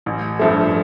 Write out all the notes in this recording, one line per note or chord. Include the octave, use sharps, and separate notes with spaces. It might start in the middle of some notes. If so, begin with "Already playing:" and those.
A1
G2 F3 A3